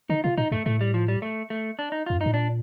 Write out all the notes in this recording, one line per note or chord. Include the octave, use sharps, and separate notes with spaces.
D3 D#4
C3 F4
A#2 D#4
G2 A3
A2 A3
G3
F3
G3
A3
A3
D4
D#4
F2 F4
G2
D#4
A2
A#2 D4